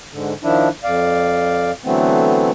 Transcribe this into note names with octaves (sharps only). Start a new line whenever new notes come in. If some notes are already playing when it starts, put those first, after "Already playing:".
G#2 D3
D#3 F3 D4 E4
F2 D5 F5
D3 E3 F#3 A3 B3 C4